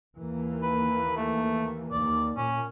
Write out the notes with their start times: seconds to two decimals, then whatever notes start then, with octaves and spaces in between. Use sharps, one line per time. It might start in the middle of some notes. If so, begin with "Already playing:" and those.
0.17 D#2 E3 A#3
0.62 B4
1.16 A3
1.92 D#2 D5
2.37 A#2 C#4